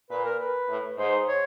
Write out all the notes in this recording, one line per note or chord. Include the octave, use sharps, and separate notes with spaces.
A#2 B4
A#4
B4
A2
G#2 C5
C#5